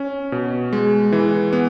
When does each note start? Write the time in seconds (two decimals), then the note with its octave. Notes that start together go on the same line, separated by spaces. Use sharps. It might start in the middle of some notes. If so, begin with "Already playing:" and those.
Already playing: C#4
0.32 B2
0.73 G#3
1.12 E3
1.53 B3